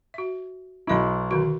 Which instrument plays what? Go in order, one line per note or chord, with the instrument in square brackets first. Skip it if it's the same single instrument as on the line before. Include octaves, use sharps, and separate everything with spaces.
[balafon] F#4 E5
[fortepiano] B1 E4 [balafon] F#4 D#5 B5
[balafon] D3 D#3 F#4